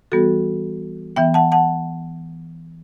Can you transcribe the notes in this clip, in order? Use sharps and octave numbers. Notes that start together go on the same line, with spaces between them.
E3 G3 B3 F#4 A4
E3 B3 E5 G5
F#5 A5
F#5 A5